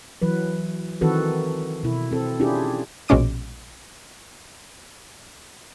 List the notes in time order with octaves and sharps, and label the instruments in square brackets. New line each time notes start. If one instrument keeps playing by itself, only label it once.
[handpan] E3 F#3 B4
D#3 E3 C4 F#4 A4 B4
B2 E4
C4 A4
C#4 D4 E4 F4 G4 G#4
[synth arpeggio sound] A#1 B2 G#3 C#4 D6 D7